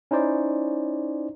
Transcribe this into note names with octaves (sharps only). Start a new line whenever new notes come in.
C#4 D#4 E4 C5 D5